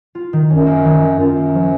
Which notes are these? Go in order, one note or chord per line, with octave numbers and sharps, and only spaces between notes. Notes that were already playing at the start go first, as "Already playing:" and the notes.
F4
D#3
F#2 C#4
A#3
D#3
D#3
F#2 F4
A#3
F3